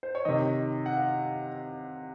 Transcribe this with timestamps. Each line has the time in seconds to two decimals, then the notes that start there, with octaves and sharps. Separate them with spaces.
0.03 C5
0.15 C#5
0.25 C3 D#3 D#5
0.86 F#5
0.97 F5